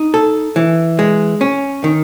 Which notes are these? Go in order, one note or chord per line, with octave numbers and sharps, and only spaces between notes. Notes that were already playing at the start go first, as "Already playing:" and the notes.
Already playing: D#4
A4
E3
G#3
C#4
D#3